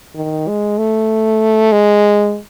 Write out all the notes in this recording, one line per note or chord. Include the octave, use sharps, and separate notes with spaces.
D#3
G#3
A3
G#3